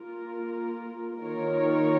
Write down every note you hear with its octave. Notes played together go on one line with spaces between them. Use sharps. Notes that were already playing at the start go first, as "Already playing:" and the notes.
Already playing: A#3 F4 A#4
D#3 A#3 F4 A#4 C#5